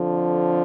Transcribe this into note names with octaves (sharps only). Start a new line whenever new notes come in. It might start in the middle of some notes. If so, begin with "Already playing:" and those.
Already playing: F2 D3 F3